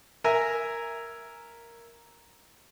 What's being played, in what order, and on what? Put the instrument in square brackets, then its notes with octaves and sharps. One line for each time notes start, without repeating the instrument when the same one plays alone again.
[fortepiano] A#4 E5 G#5 A#5